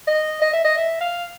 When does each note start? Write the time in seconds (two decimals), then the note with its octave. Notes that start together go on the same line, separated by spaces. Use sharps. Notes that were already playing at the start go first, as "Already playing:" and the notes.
0.07 D#5
0.42 D#5
0.53 E5
0.65 D#5
0.77 E5
1.00 F5